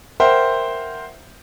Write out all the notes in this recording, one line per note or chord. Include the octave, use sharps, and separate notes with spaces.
A#4 C5 E5 F#5 G5